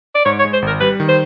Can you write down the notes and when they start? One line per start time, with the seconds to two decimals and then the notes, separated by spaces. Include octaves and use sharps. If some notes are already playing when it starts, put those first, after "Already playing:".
0.15 D5
0.26 G#2 C#5
0.39 C#5
0.44 G#3
0.53 C5
0.62 G#1 A#4
0.81 G3 B4
1.00 D#3
1.09 C5